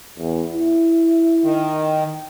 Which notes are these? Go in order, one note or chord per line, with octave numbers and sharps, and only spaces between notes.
E2
E4
D#3